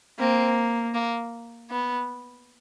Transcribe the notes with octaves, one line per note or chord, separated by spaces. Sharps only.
A#3 C4
A#3
B3